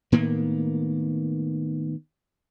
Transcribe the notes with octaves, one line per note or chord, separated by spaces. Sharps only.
A2 D#3 A#3 B3